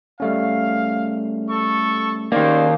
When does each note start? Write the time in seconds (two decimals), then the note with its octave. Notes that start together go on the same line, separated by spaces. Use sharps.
0.20 G3 A3 C#4 F5
1.50 A4 C#6
2.32 D#3 A#3 C#4 D#4 G4 G#4 C5 D5